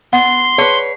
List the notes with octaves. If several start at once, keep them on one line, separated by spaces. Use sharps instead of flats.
B3 F#5 C6 C7
G#4 B4 C#5 D5 A5